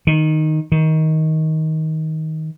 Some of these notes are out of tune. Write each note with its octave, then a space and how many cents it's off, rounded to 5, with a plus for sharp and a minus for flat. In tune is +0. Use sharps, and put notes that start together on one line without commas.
D#3 -5
D#3 +20